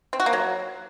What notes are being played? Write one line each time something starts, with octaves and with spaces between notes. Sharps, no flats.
C4
F#4
A#3
F#3